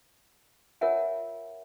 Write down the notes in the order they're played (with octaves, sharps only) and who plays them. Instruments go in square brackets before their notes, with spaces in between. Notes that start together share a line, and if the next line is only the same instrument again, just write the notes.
[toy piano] F4 A#4 C#5 E5 F#5 G#5